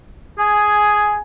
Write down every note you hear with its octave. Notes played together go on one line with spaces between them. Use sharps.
G#4 G#5